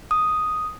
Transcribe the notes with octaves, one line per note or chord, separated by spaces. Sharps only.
D#6